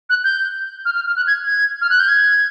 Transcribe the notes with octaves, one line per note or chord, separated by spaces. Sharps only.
F#6
G6
F6
F6
F6
F#6
G#6
G#6
F6
F#6
G6
G#6